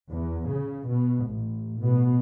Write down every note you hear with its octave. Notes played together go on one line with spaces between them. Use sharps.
E2
C#3
B2
A1
B2